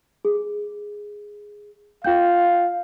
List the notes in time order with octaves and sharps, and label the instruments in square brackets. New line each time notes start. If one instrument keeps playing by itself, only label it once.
[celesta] G#4
[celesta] F4 G5 G6 [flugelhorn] F5